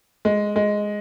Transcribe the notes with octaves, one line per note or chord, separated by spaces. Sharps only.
G#3
G#3